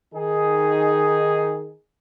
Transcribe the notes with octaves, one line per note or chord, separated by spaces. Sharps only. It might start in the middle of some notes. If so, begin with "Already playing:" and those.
D#3 D#4 G#4